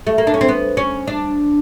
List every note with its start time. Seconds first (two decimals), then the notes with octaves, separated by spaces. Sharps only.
0.07 A3
0.18 A#3
0.27 D4
0.34 C#4
0.41 C4
0.49 B3
0.77 C#4
1.07 D4